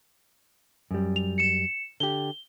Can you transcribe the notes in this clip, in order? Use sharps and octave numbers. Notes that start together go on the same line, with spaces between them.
F#2 G3
F7
C#7 E7
D3 G4 G7